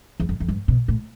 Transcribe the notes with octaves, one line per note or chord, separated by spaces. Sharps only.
E2
F2
F2
G2
B2
A2